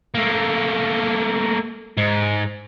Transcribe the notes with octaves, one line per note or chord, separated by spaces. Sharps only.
A3 A#3
G#2